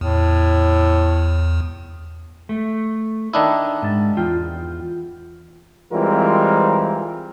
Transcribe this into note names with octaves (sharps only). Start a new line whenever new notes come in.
E2 A2
A3
D#3 D4 E4 D#5
G#2 A5
E2 F4 G5
E3 G3 G#3 C4 F4 A#4